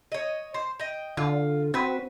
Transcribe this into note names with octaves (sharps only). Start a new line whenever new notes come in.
C#5 D#5
C5
D#5 G5
D3 F4
C4 F#4 B4